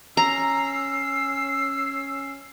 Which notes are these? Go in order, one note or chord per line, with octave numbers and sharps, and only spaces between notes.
C#4 A#5 E6 C7